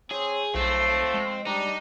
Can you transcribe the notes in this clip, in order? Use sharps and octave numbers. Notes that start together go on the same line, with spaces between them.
C4 G#4 C#5
B1 F3 A3 C4
G#3
G3 D4 D#4